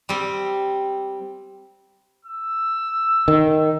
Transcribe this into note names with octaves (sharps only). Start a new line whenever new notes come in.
G3 C4
E6
D#3